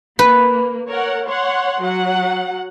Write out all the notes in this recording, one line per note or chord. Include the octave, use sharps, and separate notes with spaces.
A#3 B4
A#4 C#5 F#5
C#5 F#5 C6
F#3 F#5